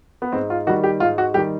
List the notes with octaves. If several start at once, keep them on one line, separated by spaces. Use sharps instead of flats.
B3
G#2 C4
F4
D#3 G3 F#4
G4
G#2 F4
F#4
D#3 G3 G4